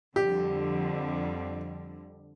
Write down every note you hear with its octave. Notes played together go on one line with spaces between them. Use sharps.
F2 D3 G3 G4